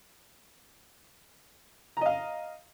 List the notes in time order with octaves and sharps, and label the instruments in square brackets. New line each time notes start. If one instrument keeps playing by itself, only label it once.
[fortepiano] A#5
D#5
F5